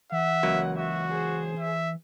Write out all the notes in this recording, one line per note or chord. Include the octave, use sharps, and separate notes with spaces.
E3 E5 F#5
C#2 F#3 A#3
F#4 E5
G#4 C5
E5